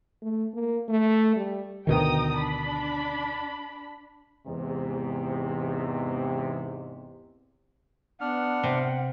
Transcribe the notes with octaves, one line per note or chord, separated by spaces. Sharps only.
A3
A#3
A3
G3
D2 B2 D#3 G5 A#5 D#6
D4 B5
E2 G#2 C3
B3 D4 F#5 F6
C3